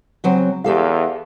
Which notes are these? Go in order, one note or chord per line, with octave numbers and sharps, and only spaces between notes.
C#3 F#3 C4
E2 G4 A4 F5